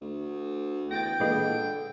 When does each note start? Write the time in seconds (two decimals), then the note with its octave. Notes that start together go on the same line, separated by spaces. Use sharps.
0.01 D2
0.91 E2 G5 A6 A#6
1.20 A#2 D3 E3 G#3